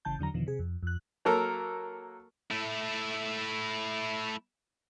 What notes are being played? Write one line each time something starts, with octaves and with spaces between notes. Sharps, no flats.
G1 C#3 E3 A5 G6
E2 D3 F#3 A#5
E2 B2 D3 D#3 F3
C3 G#4
F2
F2 F#6
F#3 A#3 A4 A#4
A3 E4